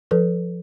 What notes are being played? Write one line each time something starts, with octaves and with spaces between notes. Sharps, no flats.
F3 A4 B4